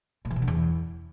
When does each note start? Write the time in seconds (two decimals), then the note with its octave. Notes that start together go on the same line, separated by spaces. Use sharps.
0.25 A#2
0.30 E3
0.36 B2
0.42 D3
0.48 E2